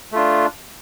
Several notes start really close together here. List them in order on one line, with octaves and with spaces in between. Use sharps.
A3 F4 D4